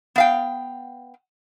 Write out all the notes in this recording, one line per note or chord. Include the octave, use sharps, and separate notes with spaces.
B3 F5 G5